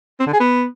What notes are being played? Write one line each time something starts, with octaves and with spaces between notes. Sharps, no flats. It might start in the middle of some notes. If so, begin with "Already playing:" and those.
C4
D3
G#4
B3